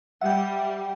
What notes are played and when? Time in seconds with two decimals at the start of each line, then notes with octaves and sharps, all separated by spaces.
0.21 G3 E5 F#5 G5